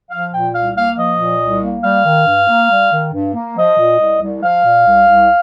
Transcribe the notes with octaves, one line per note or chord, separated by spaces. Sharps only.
F3 F5
A#2 G5
C2 F5
A#3 F5
F3 D#5
A#2
C2
A#3
G3 F5
D#3
G2
A#3
G3
D#3
G2
A#3
F3 D#5
A#2
C2
C2
F3 F5
A#2
C2
C2